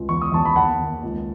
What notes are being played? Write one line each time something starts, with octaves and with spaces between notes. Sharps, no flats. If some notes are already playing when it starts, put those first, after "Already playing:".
Already playing: C#2
E2 C#6
D#6
E2 A5 C#6
B5
D#2 F#5 A5
D#2
C#2